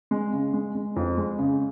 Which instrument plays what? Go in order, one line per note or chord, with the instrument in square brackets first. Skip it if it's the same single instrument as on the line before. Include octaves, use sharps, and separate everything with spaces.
[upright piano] G#3
C#3
G#3
G#3
F2
G#3
C#3